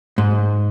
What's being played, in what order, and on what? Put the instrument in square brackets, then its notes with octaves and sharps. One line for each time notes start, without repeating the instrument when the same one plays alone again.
[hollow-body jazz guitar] G#2